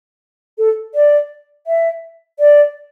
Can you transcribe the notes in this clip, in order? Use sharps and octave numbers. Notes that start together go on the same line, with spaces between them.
A4
D5
E5
D5